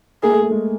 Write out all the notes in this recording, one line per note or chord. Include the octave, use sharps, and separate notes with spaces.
A#3 G#4
A3
A3
G#3